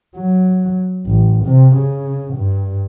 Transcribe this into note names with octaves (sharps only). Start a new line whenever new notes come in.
F#3
A1
C3
C#3
G2